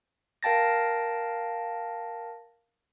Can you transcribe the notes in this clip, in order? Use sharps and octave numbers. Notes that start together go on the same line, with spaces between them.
A#4 F5 G5 A5 A6 A#6